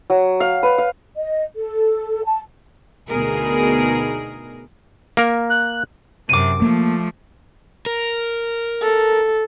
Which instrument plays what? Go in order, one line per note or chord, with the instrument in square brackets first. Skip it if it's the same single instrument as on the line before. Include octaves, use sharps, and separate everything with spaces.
[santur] F#3
F5
B4
F5
[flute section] D#5
A4
A5
[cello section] D2 B2 B3 D#4 G#4 A#4
[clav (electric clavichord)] A#3 A#4
[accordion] F#6
[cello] F#2 C3 [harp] D6 D#7
[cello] F3 A3 [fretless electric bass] A#3
[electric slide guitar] A#4
[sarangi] A4